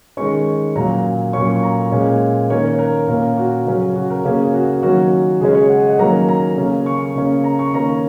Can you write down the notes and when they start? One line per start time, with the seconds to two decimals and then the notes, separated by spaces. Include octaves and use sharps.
0.17 D#3 G#3 C#4 C#6
0.75 A#2 F#3 C#4 A#5
1.33 A#2 F#3 C#4 C#6
1.56 C#6
1.63 A#5
1.92 A#2 G#3 C#4
2.50 D#3 A#3 C#4 C#5
2.68 C#5
2.79 A#4
3.08 A#2 A#3 C#4
3.37 F#4
3.66 C#3 F#3 C#4
3.96 F#4
4.10 A#4
4.24 C#3 A#3 C#4 G#4
4.54 F#4
4.83 D#3 F#3 A#3 C#4 F#4
5.41 C#3 G#3 C#4 G#4
5.55 C#5
5.69 F#5
5.79 D#5
5.89 F#5
5.98 D#3 F#3 A#3 C#4 A#5
6.29 A#5
6.57 C#3 A#3 C#4
6.86 C#6
7.15 C#3 A#3 C#4
7.44 A#5
7.59 C#6
7.73 D#3 A#3 C#4 A#5